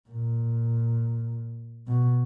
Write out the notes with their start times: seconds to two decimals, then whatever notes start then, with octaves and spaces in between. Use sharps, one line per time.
0.10 A#2
1.88 B2